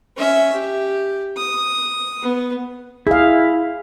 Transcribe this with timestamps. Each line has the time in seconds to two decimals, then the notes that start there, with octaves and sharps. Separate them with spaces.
0.17 C#4 E5
0.55 G4
1.37 D#6
2.22 B3
3.07 E4 G#4 F5